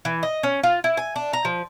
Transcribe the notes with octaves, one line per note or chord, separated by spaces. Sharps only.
E3
D#5
C#4
F4
E4
G#5
D4
A#5
F3